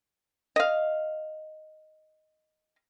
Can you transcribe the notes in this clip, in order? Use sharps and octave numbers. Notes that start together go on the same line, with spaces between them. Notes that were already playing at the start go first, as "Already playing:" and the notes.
D#5 F5